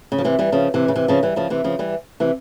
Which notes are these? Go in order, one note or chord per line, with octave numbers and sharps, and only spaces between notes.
C#3
F3
C3 E3
E3 G3
C#3 F3
C3 E3
C#3
C3 E3
C#3 F3
E3 G3
C#3 F3
C3 E3
C#3 F3
E3 G3
C3 E3